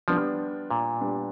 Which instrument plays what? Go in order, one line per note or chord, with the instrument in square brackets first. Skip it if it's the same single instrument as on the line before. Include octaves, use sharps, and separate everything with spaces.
[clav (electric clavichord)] F3 [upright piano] G3 B3 D4
[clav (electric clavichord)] A#2
[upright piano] G3 B3 D4